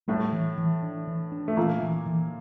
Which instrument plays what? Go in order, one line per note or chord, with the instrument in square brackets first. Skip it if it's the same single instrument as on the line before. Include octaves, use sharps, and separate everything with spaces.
[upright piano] A2 A3 [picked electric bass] G3
[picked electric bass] E3
E3
D4
E3
D4
[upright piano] A3
[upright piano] A#2 A#3 [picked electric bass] E3
[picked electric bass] E3
E3